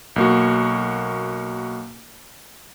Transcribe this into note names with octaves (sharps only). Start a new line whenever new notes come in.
B1 A#3 F#4